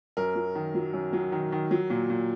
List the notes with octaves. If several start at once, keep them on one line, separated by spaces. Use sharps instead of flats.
F#2 A#4
F#3
D#3
F#3
F#2
F#3
D#3
D#3
F#3
A#2
A#2